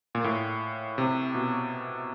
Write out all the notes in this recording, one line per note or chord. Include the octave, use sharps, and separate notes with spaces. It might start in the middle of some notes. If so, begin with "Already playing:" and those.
A#2
A2
C3
B2